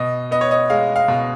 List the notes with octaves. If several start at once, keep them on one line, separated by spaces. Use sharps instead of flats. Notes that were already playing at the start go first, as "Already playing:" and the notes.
Already playing: B2 D#5
B3 D#5
C#5
D#5
G#3 F5
F5
B2